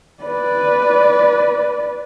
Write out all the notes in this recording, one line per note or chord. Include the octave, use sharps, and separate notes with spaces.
B4 D5